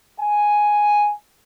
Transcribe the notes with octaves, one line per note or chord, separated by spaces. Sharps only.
G#5